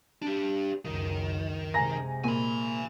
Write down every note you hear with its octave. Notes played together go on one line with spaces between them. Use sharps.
D4 G4
C#2 F#2 D#3
C3 G#3 G#5 A#5 A#6
A#2 G#5 B5